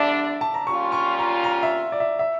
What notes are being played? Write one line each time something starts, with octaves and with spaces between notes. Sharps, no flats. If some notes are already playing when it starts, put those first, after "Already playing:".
Already playing: E2 D3 G3 D4 D5 E5
A5
A#5
A#2 G3 C#4 F4 C#6
C#6
A#5
A#5
E5
D5
E5
E5